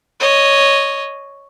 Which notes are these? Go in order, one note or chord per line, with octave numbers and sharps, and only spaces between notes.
C#5 D#5